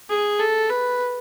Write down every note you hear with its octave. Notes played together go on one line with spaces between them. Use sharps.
G#4
A4
B4